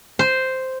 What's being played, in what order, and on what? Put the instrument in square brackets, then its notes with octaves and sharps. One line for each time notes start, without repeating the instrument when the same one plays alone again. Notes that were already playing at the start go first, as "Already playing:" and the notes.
[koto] C5